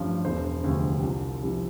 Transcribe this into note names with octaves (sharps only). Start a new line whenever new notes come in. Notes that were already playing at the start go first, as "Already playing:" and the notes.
Already playing: A1 G2 F3
E1 C5
C5
D2 C3 F3
G4
C2 F4
C3 F3 E4